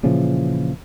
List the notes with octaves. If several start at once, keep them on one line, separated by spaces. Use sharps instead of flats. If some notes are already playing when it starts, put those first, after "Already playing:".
A#2 C#3 E3 F3